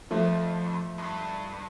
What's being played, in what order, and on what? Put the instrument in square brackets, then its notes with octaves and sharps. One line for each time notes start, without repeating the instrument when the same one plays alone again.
[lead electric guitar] F2 [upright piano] F3 A3
[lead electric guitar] F2
G2